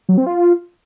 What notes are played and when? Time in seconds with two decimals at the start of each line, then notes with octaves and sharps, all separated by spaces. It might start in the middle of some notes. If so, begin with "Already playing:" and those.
0.09 F#3
0.18 C4
0.26 F4